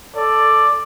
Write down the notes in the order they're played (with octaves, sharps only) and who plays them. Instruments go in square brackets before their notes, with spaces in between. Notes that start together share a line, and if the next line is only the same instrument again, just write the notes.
[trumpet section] A4 D5